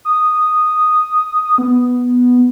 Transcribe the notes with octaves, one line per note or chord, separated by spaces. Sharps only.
D#6
B3